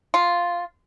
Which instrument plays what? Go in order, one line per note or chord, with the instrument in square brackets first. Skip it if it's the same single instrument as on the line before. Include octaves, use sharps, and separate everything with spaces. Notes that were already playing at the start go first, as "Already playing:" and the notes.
[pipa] F4